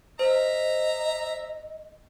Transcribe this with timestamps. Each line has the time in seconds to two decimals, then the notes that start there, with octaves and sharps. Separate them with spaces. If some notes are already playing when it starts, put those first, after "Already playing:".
0.19 C5 D#5 E5 A#5